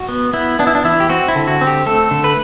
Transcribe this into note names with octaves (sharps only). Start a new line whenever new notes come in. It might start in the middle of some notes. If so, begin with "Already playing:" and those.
Already playing: F#4
B3
B3 E4
B3 D4
E4
D4
E3 E4
G4
C4 F#4
E4
D3
F#4
C4
G4
A3 A4
D3
B4